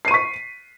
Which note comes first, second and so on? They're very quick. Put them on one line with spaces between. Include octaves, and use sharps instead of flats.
C7 D#7 C#6 B6